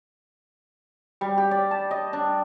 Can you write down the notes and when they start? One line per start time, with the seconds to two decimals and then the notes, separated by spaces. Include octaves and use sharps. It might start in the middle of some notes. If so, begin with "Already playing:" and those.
1.21 G3
1.38 G4
1.51 D5
1.71 A5
1.91 D#5
2.13 D4